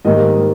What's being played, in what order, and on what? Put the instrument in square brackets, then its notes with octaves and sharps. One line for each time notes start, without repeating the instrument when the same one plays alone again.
[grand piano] G#2 D#3 G3 A#3 D#5